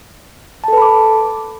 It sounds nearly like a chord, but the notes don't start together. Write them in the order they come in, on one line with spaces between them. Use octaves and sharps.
A5 A4 B4 B5 D6